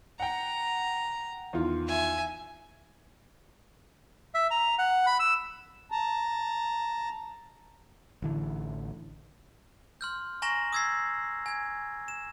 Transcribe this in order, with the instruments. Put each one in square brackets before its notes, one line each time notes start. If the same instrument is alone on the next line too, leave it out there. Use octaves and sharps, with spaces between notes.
[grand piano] F#5 G5 [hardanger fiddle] A#5
[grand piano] E2 D#3 F4
[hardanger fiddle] E5 G#5
[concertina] E5
A#5
F#5
B5
E6
[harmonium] A5 A#5
[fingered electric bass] A1 D3 E3
[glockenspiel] C6 F6 G6
G#5 A#5 C#6 A#6 E7 F#7
D#6 E6 G#6 A6 C7
G#5 G#6
E7